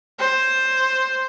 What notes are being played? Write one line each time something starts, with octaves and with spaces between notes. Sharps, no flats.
C5